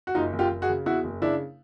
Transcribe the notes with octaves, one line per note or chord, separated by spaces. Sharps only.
F#4
F#1 D#4 F4
F#1
F4 G4
F#1
F#4 G#4
C#3
E2 E4 F#4
F#1
C#3 D4 E4